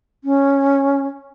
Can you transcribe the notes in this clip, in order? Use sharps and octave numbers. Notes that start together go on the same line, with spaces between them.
C#4